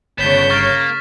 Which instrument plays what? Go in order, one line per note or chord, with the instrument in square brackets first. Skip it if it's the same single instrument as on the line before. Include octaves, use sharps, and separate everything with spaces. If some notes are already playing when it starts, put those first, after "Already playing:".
[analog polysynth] G1 C#5 [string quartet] C#3 G6 [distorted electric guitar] B3 D4 [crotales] B6 E7
[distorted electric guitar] A#3 [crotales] C#6 F6 A6